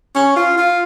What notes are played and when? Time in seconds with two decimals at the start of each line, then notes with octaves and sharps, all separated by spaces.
0.15 C#4
0.36 F4
0.58 F4